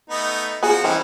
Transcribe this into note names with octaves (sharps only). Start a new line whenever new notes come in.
A3 B3 D#4
F3 B3 F4 F#4 G#4
D#3 E3 G3 C4 C#4